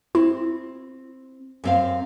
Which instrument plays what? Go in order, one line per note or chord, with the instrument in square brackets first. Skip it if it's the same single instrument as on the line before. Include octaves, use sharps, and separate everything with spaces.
[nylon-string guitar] C4 [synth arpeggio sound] E4
[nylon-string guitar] F#2 C4 F5